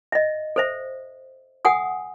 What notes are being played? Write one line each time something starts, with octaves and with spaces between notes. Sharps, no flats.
D#5 E5
A4 C5 E5
A4 F#5 G#5 D#6